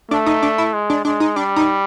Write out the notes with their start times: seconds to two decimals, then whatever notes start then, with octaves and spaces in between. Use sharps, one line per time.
0.11 A3 D4
0.26 D#4
0.42 D4
0.58 E4
0.74 G#3
0.90 D4
1.05 G#3 D4
1.20 D#4
1.36 G3 D4
1.56 D#4